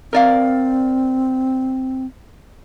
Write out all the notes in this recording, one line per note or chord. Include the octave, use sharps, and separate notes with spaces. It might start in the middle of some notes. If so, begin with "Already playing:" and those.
C4 A#4 D5 F5